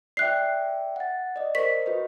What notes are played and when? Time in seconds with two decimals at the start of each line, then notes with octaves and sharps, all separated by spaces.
0.17 D5 E5 G5 F#6 C7
0.96 F#5 A6
1.36 D5 D#5
1.55 A#4 C5 C#6 B6
1.86 F#4 B4 D#5